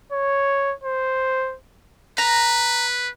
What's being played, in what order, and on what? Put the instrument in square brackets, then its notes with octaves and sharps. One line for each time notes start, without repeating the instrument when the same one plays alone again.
[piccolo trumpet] C#5
C5
[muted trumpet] B4 [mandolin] A#5